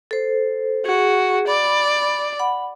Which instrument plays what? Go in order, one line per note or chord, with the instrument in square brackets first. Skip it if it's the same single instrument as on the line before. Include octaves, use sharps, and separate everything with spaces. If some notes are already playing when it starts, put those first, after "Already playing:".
[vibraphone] A4 C5
[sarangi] F#4 [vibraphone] G#4
[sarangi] D5 [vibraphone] B5
[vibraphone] F#5 B5